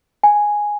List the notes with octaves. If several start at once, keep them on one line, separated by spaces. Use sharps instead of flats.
G#5